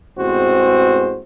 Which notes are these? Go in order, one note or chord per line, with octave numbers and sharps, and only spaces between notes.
A1 E2 G#3 C4 F#4 C5